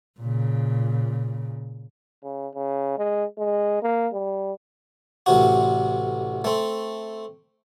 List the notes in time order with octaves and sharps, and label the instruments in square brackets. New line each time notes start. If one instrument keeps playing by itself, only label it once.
[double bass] A#2 C#3
[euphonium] C#3
C#3
G#3
G#3
A#3
G3
[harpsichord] A1 C3 F#4
A3 C4